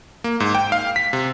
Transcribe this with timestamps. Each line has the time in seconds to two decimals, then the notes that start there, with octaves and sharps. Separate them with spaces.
0.24 A#3
0.40 G#2
0.55 G5
0.72 F5
0.96 B6
1.13 C3